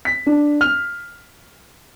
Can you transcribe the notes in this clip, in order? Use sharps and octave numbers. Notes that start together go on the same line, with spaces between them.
B6
D4
F6